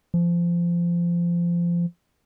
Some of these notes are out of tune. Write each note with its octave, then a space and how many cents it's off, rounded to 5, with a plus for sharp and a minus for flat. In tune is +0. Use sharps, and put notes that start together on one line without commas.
F3 -20